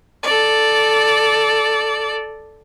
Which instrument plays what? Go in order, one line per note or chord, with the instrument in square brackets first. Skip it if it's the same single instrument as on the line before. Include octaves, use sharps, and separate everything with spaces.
[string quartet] A4 D5